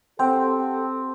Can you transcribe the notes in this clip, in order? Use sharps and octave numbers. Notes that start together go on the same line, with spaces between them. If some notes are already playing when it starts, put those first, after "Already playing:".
C4 G4 A4 F#5 G5